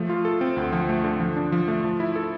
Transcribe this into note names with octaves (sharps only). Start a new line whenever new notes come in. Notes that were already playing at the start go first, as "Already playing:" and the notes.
Already playing: F3 A3
F4
A4
C4
D2
F3
A3
D3
F3
D4
F3
A3
F3
E4
A4